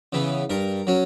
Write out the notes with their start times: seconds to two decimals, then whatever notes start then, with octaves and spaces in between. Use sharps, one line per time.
0.13 C#3 E3 B3
0.50 G2 A#4
0.87 F#3 C#4